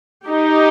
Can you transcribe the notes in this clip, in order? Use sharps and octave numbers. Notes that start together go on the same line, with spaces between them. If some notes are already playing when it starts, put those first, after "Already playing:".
D#4 G4